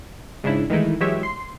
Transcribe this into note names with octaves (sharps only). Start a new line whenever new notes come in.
G#2 C#3 D4 E4
D#3 E3 G#3 A3 D#4 E4
E3 F#3 G#3 G4 C#5 E5
C6 C7